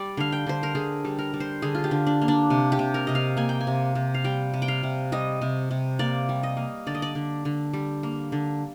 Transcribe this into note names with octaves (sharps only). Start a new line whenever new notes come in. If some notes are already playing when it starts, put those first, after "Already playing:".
Already playing: G3 D5
D3 F5
G5
D3 C5
A#4
D3 G#4
G3
A#4
G3
C5
D3 G#4
F4
G4
D3
D4
A#3
D4
C3
G4
C3
A#4
C3 D#5
F5
A#3 G#5
G5
G#5
C3
C3
F5
G3 G5
C3
G5
F5
C3
G3 D#5
C3
C3
A#3 D5
G3
D#5
A#3
D3 D5
D#5
D5
D3
D3
G3
A#3
D3